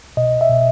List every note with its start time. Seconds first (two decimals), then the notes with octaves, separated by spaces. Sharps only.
0.17 B2 D#5
0.41 E5
0.49 B2